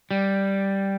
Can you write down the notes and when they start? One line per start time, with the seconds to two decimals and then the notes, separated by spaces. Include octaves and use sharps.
0.11 G3